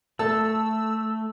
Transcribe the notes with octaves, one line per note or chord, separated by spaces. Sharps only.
A3 A4 A5 E6